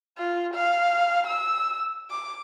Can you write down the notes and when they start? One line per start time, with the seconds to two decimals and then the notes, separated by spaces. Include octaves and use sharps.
0.18 F4
0.55 F5
1.28 E6
2.10 D6